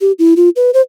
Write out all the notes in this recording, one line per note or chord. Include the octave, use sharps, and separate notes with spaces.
G4
E4
F4
B4
C5